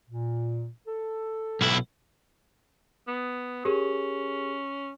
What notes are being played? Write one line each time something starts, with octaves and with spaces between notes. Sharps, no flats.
A#2
A4
B1 E4
B3
C#4 G4 G#4 A#4